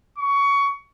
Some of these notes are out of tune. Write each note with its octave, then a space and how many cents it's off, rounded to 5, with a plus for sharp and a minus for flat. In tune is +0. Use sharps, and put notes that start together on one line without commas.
C#6 +20